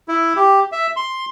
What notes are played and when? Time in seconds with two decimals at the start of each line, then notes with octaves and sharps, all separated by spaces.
0.08 E4
0.36 G4
0.72 E5
0.96 C6